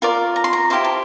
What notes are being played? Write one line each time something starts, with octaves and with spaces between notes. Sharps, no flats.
F4 A#4 D5
A#5
C6
A#5
E4 G4 C5 F5
A5